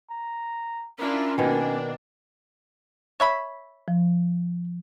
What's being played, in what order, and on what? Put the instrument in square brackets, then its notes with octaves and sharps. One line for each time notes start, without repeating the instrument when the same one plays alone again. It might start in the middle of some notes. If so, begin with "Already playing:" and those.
[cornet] A#5
[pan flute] C#4 [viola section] D4 E4 F4 [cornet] A#4
[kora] B2 D#3 [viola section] A#3 D4 [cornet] G#5
[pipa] C#5 E5 B5
[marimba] F3